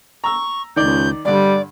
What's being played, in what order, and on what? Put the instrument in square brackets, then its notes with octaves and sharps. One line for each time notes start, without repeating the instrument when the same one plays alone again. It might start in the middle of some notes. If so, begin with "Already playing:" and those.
[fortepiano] A#5 E6 [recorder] C#6
[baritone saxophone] C#2 [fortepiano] D#3 D#4 D5 [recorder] G6
[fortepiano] G2 D3 [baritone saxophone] G3 [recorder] D5